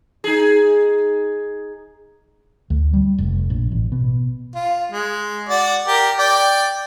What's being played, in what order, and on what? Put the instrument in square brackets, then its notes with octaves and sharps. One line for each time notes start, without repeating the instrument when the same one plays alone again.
[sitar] D#4 G#4
[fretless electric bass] D2
G3
F1
A#1
A1
B2
[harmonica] F4
G#3
F#4 D5
G4 A#4
D5 G5